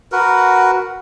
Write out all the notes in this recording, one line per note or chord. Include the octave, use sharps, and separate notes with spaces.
F#4 A#4 B4